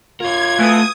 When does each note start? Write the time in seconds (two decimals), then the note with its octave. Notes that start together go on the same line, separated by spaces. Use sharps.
0.20 F4 A#4 C#5 G#6
0.59 F2 B2 E3 A3 D#6